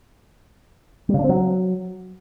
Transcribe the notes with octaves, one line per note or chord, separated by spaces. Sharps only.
G3
C#3
D4
C4
F#3